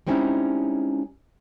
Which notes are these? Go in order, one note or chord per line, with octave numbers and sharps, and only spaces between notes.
G3 G#3 C4 C#4 D#4 E4